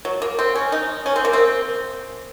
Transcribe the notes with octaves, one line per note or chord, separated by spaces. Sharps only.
F#3
A#3
C4
C#4
D#4
C#4
C4
A#3
C4